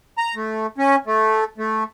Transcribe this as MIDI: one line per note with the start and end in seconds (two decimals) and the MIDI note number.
0.18 0.35 82
0.35 0.67 57
0.78 0.96 61
1.07 1.44 57
1.58 1.84 57